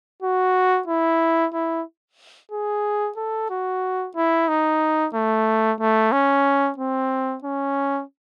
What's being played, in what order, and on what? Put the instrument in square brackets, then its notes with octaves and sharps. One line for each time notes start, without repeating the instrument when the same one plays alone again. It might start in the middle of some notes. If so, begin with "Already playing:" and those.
[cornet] F#4
E4
E4
G#4
A4
F#4
E4
D#4
A3
A3
C#4
C4
C#4